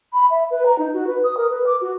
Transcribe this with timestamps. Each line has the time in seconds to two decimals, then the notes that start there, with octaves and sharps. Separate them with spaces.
0.13 B5
0.30 E5
0.51 B4
0.66 A#5
0.78 D#4
0.94 F#4
1.07 B4
1.24 D#6
1.37 A#4
1.50 B4
1.67 D6
1.81 F#4